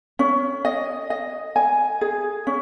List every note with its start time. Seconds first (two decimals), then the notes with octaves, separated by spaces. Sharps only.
0.19 C#4
0.65 D#5
1.10 D#5
1.56 G#5
2.01 G#4
2.47 C#4